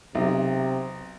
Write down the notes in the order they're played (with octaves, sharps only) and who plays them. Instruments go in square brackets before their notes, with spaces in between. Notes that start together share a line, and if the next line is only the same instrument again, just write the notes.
[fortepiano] B1 [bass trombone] C3